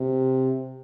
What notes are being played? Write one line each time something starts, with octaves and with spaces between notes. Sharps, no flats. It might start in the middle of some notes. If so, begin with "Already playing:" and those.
Already playing: C3